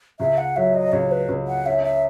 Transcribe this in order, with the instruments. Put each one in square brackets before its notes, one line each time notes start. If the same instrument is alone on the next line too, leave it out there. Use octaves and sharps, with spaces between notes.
[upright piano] C#2 [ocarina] E5
[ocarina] F#5
[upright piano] F#3 [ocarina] E5
[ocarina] D#5
[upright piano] C#2 [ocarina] C#5
[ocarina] B4
[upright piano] C#2
[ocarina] F#5
[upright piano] C#4 [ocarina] E5
[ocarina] E5